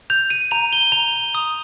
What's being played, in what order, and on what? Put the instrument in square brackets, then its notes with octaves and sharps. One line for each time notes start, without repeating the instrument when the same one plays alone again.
[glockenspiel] G6 F7
D#7
A#5 F7
G7
A#5 F7
D#6